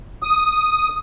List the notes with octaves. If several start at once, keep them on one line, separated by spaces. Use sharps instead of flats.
D#6